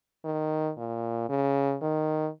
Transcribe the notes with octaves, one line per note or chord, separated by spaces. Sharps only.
D#3
A#2
C#3
D#3